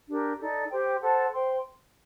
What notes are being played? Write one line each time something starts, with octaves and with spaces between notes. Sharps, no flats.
D4 G4 A#4
D#4 A4 D5
G4 C5 G5
A4 C5 F#5 A5
C5 G5 C6